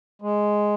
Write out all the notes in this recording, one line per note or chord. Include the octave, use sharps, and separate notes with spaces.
G#3